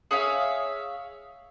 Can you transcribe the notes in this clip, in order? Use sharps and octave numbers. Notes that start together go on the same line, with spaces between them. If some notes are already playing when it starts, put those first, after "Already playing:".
G#4 C#5 E5 F5